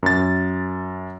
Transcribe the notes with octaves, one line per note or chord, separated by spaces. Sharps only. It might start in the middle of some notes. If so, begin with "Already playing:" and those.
F#2 A6